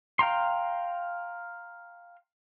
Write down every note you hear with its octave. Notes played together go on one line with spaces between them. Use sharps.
F5 G5 A#5 C6